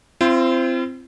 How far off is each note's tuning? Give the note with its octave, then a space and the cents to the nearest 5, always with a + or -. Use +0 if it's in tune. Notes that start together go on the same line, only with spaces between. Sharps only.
C4 +0 F4 -45 C5 +0